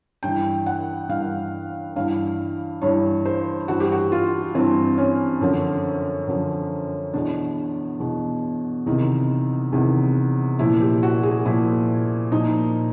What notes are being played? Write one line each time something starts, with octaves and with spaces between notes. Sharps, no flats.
G2 E3 G5
F#5
G2 E3 F5
G2 E3 F5
G2 E3 C#5
C5
G2 E3 F#4
G4
F#4
F4
G2 E3 C4
C#4
F#2 D3 F3
F#2 D3 F3
E2 B2 D4
E2 B2
E2 C3 D#3 D#4
E2 C3 D#3
A#2 F3 E4
G4
F#4
G#4
A#2 F3 E4
A#2 F3 D#4